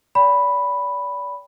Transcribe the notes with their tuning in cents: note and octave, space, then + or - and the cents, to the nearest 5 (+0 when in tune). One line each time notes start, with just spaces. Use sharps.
D5 -35 G5 +20 B5 +0